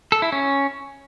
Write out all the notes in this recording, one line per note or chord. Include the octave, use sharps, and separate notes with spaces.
A4
E4
C#4